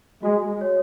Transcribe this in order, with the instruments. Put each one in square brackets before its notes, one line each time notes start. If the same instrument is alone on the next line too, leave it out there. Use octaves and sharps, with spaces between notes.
[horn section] G#3 [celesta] F#4
[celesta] C#5